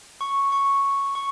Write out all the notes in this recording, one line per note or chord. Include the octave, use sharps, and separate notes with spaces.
C#6
C#6
C#6